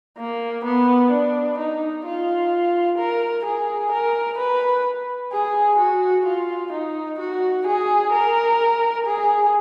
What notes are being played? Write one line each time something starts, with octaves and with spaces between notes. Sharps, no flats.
A#3
B3
D4
D#4
F4
A#4
G#4
A#4
B4
G#4
F#4
F4
D#4
F#4
G#4
A#4
G#4